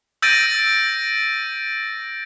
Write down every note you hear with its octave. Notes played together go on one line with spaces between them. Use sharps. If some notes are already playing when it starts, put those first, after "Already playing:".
E6 G6 A6 A#6 D7 D#7